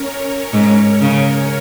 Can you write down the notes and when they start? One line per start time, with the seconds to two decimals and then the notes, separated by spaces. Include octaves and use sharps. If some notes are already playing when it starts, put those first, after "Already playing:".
Already playing: C#4 A#4 C#5
0.53 G#2
1.01 C#3